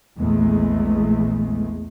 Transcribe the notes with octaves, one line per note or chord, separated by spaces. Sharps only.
A#1 E2 G#3 A3